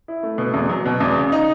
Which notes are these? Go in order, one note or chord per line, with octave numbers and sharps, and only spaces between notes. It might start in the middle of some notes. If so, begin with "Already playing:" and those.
E4
A3
B2
E2
F#3
B2
E2
C#3
D#4